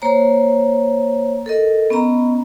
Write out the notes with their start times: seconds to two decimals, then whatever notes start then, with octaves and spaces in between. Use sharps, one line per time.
0.02 A#3 C5 C#5 A#5
1.46 A4 A#4 D#5
1.90 B3 C#4 D#5 A#5 B5